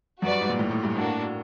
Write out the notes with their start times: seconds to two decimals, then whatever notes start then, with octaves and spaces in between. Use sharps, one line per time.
0.22 F#2 F#4 B4 D5
0.31 G2
0.41 G#2
0.50 A#2
0.59 A2
0.71 A2
0.83 G2
0.95 A2 A#3 D4 F#4